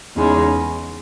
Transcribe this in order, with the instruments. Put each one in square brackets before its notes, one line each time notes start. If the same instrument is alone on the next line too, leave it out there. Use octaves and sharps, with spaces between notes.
[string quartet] E2 C#3 G#3 D#4